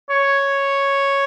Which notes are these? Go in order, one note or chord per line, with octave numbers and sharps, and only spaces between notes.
C#5